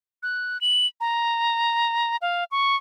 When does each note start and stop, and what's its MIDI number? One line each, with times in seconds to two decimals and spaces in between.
0.23 0.60 90
0.61 0.87 102
1.01 2.16 82
2.22 2.44 77
2.51 2.76 85